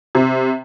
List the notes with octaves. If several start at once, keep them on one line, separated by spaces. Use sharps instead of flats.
C3